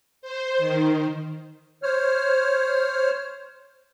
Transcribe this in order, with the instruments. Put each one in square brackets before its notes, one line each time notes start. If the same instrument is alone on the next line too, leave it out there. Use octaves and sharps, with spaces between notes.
[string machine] C5
D#3
[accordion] C5 C#5 F6